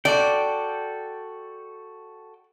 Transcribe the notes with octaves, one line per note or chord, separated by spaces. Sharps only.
F#4 A4 D5 G5